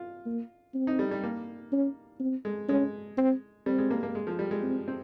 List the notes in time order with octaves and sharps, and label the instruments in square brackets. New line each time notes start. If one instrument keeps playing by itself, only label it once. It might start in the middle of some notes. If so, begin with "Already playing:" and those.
Already playing: [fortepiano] F4
[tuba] A#3
C4
[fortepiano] D#4
G3
G3
A#3
[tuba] C#4
C4
[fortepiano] G#3
[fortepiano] G#3 [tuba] C#4
[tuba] C4
[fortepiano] G3 [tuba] C4
[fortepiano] G#3
A#3
A#3
G#3
F3
G3
G#3
[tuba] C4
[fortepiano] C4